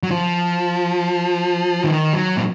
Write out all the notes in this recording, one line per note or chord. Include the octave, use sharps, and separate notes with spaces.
F#3
F3
D#3
F#3
A#2